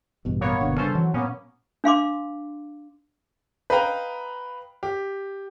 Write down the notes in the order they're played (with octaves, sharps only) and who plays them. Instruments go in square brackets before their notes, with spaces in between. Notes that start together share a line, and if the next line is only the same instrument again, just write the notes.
[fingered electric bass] A1 G2 B2
[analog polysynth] A#3 B3 C#5
[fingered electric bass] G1 B2 D3
[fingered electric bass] C#3 G3 D4 [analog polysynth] C#4 A4 C5
[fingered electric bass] E3 [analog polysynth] F#3
[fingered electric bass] A#2 [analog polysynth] A#3 B3 C#4
[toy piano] D4 F5 C6 D6
[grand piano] B4 D#5 F5 G5 A#5
G4